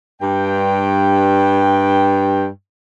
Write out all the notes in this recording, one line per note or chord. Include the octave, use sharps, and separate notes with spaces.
G2 G5